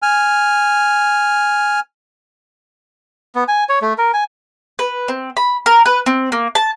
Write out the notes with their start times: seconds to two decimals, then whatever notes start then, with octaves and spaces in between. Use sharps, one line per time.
0.02 G#5 F6
3.35 B3
3.48 G#5
3.69 C#5
3.82 A3
3.98 A#4
4.14 G#5
4.79 B4
5.08 C4
5.37 B5
5.66 A#4
5.86 B4
6.06 C4
6.32 A#3
6.55 A5